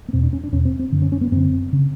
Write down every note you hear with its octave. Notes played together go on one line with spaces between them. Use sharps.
B3
E2 B2 C4
D4
C#4
D4
E2 B2 C#4
C4
C4
F#2 D3
C#4
C#4
B3
F#2 D3 C4
C#3